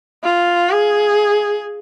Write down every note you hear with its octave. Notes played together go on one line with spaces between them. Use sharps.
F4
G#4